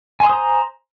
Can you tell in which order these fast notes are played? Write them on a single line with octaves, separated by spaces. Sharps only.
G#5 C6 D#6 C5 A#5